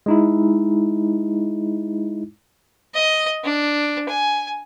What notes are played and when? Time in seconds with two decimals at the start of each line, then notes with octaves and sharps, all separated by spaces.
0.06 G#3 D#4 E4
2.95 D#5
3.44 D4
4.09 G#5